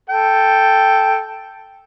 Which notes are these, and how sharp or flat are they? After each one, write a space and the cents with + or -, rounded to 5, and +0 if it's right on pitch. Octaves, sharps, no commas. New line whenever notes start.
A4 +0 G5 +0